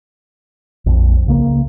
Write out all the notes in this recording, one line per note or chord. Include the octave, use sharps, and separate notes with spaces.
A#1 F2 F3
C#2 C#3 A#3